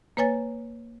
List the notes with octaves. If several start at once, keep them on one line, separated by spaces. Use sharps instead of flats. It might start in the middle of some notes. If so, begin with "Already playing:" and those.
A#3 B4 C#5 G#5 A6